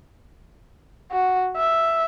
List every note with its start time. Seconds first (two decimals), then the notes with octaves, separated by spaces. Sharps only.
1.12 F#4
1.56 E5